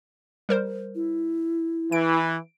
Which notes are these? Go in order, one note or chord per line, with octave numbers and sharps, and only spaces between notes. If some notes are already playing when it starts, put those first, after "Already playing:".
G3 A#4 C5
E4
E3 D7